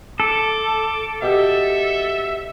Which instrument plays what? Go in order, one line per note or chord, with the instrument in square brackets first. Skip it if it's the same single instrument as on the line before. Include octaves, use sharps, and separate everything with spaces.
[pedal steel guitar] A4 [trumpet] D6
[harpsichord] B2 G4 [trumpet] E5